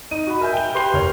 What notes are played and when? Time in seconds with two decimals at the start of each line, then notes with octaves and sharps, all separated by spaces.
0.11 D#4 D#7
0.27 F#4 B5
0.41 A#4 E5 G#5 G6
0.54 G5 G7
0.74 G4 B4 C6 C7 G7
0.93 F#1 A#4 C#5 F7